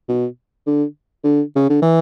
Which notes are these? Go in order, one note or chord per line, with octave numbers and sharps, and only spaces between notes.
B2
D3
D3
C#3
D3
E3